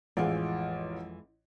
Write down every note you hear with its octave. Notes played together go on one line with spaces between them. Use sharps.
A1 F2 E3 G#3 F4